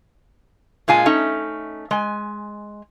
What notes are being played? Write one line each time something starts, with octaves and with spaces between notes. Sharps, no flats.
A#2 G#3 F4 G#5
A3 C#4 D#4
G#3 G#5